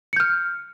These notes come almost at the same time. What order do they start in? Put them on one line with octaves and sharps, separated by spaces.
C#7 G6 F6